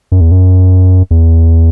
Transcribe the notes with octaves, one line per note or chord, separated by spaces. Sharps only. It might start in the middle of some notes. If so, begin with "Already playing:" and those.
F#2
E2
F#2
E2